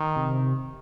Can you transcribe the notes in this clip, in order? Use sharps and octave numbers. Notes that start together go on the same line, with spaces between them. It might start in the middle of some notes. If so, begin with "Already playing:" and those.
Already playing: D#3
C3